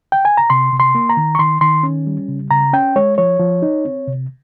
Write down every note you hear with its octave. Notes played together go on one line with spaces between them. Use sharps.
G5
G#5
A#5
C3 C6
C3
C6
A#3
A#5
D#3
C#6
D#3 C6
D#3 C6
C#4
G3
C#3
C#3 A#5
C#4 G5
G#3 C#5
F3 C#5
F3
D#4
C4
C3